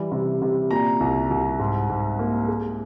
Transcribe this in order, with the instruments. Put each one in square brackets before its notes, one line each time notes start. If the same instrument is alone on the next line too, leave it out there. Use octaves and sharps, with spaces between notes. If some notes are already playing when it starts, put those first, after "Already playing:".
Already playing: [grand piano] E3 G3
C3
C3
A#2 A#5
C2
C2
G#2
G#2
A#3
G#3